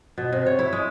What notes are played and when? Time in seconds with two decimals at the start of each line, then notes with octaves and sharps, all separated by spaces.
0.18 B2
0.32 C3
0.46 C#5
0.59 E4
0.73 G#3